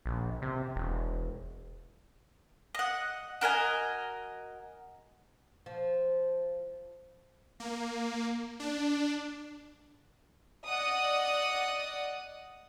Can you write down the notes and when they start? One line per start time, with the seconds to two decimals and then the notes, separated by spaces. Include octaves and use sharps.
0.06 A#1
0.42 C3
0.76 E1
2.75 D#5 F#5
3.41 F#4 A#4 D#5 G#5
5.66 F3
7.60 A#3
8.60 D4
10.66 D5 D#5 F#5 D#6